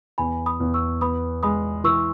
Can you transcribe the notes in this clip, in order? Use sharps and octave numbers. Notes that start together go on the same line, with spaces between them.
E2 G#5 B5
B5 D#6
E2
C#6 E6
B3 B5 D#6
G#3 B5 D#6
E3 C#6 E6